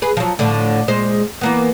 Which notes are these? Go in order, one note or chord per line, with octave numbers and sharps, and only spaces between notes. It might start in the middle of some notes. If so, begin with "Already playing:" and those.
G#4 B4
F3 F#3
A2 D3 F3
A#2 G#3 C5
E3 A#3 B3